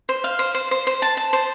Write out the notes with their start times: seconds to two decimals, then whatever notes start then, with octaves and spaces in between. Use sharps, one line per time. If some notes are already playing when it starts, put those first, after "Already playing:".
0.09 C5
0.24 F5
0.39 C5
0.54 C5
0.71 C5
0.87 C5
1.02 A5
1.17 A5
1.33 C5